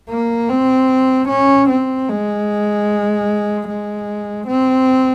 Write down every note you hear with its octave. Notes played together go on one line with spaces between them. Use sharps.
A#3
C4
C#4
C4
G#3
G#3
C4